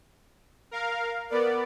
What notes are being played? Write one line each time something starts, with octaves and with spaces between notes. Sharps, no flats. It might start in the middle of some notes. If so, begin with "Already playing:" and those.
A#4 F5
B3 A#4 D5